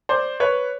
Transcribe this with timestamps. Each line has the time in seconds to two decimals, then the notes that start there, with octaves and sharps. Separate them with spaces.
0.09 C5 D5
0.40 B4 C#5